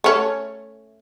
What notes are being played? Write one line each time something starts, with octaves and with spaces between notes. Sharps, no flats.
A3 C#4